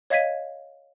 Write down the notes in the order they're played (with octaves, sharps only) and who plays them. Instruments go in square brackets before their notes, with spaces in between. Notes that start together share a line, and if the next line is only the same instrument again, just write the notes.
[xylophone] C#5 D#5 F5 G#6 B6 D#7